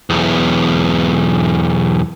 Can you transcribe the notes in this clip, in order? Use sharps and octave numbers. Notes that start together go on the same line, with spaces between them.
B1 E2